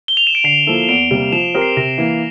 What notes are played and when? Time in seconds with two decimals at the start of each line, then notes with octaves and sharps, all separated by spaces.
0.08 G7
0.17 F7
0.27 E7
0.35 D7
0.44 D3 C7
0.67 F3 A#3 E4 A4
0.89 E2 D7
1.11 C3 G3 A#3
1.32 F3 E7
1.54 C4 G4 A#4
1.62 C7
1.77 C3 A#6
1.98 E3 A#3